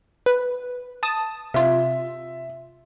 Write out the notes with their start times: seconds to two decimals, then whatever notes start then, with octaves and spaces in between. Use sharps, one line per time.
0.26 B4
1.03 A5 D#6
1.54 C3 F4 E5